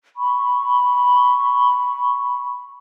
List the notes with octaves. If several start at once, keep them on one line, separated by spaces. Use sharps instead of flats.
B5 C#6